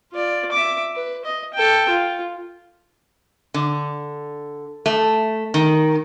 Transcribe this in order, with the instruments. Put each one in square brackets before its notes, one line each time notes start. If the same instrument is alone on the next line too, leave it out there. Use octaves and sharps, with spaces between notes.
[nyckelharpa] F4 D5
E5 D6
B4
D#5
A4 G5
F4
[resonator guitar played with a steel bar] D3
A3
D#3